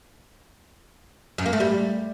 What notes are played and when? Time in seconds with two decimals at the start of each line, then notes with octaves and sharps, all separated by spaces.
1.38 F#2
1.46 A#3
1.53 A3
1.60 G3